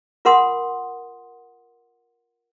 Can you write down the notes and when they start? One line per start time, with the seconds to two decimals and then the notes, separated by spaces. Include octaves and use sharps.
0.25 F4 A#4 F#5 C6 D#6